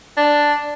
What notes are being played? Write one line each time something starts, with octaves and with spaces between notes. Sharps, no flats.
D4